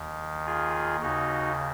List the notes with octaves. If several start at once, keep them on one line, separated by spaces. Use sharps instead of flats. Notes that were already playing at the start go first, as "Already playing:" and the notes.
Already playing: D#2 D#3
F4 G#4
D#2 C#3 D#4 F#4